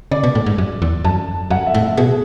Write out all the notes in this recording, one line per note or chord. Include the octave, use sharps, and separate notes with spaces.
C#3 D5
B2
A2
G#2
F#2
E2
F#2 A5
F#2 F#5
E5
A2
E5
B2 G#4